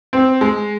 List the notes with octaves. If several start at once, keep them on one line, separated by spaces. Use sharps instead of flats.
C4
G#3